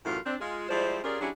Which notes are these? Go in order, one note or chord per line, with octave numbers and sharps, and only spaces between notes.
F#2 A2 E3 F4 F#4 A#4
C4 D4
G#3 F4 G#4
F3 G3 G#3 E4 C5 D5
C#4 F4 G4 G#4 A#4 D5
F#3 C#4 D4 E4 G4 G#4